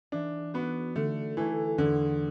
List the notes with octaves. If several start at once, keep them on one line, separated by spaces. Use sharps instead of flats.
E3 D4
B3 D4 F#4
D3 A3
E3 A3 E4
E2 D3